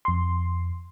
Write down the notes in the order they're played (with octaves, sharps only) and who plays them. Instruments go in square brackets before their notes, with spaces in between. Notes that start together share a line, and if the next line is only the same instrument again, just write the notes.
[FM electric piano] F2 C6